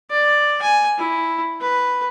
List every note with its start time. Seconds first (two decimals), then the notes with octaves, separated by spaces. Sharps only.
0.10 D5
0.62 G#5
0.98 E4
1.61 B4